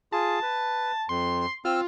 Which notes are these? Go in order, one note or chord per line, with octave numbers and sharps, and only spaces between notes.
F4 G#4 A5
B4
F2 C6
C4 F4 E6 F6